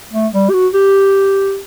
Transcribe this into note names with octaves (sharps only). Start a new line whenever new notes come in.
A3
G3
G4
F#4
G4